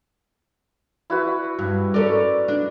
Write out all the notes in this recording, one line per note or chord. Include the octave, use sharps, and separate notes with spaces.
E4 F#4 B4
G2
C#4 A4 A#4 D5
D4